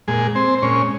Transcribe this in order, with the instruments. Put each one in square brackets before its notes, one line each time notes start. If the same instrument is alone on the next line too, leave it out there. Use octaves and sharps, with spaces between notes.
[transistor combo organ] A#2 G#3 G#4
C4 C5
C5
A#2 G#3 C#4 C#5